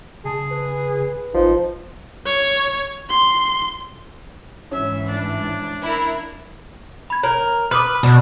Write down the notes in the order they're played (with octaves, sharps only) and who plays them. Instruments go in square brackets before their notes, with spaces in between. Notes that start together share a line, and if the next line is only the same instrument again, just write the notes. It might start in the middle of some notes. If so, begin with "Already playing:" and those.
[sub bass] C#3 [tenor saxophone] G#4 [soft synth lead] A5
[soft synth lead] B4
[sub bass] G#1 [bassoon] F3 [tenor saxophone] D#4
[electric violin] C#5
C6
[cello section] G#2 E3 [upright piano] C#4 [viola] E5
[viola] D4
[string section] E4 A#4
[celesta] B5 G#6
[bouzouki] A#4 [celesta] C#5
[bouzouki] B4 [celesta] D6 D#6 F6
[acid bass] B2 [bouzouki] D4